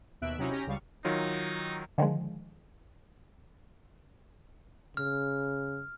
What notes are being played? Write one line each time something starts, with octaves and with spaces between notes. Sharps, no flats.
D#2 B2 E5 F#6 D7
C3 F#3 C#4 D#4 E4 F#4
C#4 G4 A#5
C#2 C#3 G3 F5 C#6
D#3 F#3 D#4 F4
D3 D#3 F3 G#3
C#3 F6